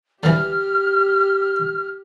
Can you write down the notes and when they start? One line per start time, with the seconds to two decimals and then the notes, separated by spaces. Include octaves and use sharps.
0.23 D3 E3 G4 F6